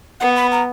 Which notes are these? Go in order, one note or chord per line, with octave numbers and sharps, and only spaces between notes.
B3 F#5
B5
A#5